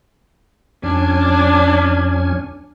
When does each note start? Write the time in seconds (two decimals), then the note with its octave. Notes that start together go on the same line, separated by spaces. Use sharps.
0.83 F2 C#4 D4 G#5